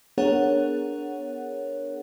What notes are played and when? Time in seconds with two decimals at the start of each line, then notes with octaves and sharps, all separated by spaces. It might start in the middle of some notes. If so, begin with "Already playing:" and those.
0.18 B3 D4 G#4 A#4 C#5 F#5